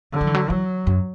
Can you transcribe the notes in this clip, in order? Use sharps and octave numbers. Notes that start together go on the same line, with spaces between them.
D3
F#3
E3
F#3
E3 F#3
F#2